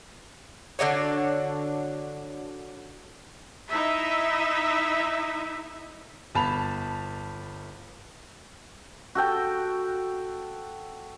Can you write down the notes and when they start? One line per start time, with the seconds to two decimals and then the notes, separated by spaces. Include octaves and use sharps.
0.79 D3 D4 F#4 C#5
3.69 D#4 E4 E5
6.35 G1 A5 B5 F7
9.15 F#4 A4 G5